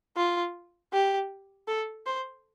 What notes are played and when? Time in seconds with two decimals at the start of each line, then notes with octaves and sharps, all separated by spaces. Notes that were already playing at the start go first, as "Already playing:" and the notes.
0.17 F4
0.93 G4
1.68 A4
2.06 C5